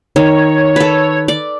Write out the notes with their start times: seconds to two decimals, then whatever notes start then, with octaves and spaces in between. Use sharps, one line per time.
0.16 D#3 C#5
0.76 A4 B4
1.28 D5